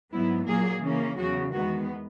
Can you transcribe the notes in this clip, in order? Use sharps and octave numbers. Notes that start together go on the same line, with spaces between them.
G#2 F#3 B3 E4
A#2 F#3 A#3 G#4
C#3 E3 A#3 C#4
E2 C#3 F#3 F#4
E2 D#3 G#3 B3 F#4